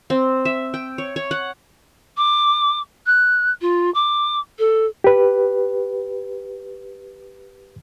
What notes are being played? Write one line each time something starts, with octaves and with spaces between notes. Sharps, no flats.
C4
E5
G5
C#5
C#5
F#5
D6
F#6
F4
D6
A4
G4 B4